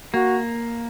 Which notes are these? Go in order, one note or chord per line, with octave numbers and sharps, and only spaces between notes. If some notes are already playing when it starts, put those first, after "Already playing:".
A#3 F#4